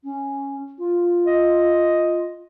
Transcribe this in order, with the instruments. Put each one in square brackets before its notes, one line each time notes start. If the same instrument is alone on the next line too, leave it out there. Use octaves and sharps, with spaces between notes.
[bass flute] C#4
F4
[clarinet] D#5